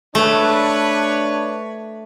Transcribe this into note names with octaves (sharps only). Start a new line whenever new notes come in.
A3 D4 B4 C#5